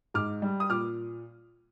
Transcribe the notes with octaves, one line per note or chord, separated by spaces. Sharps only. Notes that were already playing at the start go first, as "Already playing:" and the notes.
G#2 D6 F6
G3
D#6
A#2 D6 F6